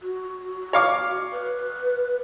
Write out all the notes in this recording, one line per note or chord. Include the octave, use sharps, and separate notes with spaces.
F#4
C#5 F5 D6
B4